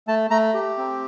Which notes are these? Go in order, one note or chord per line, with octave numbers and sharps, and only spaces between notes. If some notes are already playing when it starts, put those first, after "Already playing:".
A3 A5
A3 A#5
G4
C4